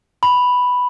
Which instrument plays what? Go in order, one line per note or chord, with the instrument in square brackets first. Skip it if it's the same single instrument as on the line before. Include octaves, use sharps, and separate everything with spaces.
[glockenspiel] B5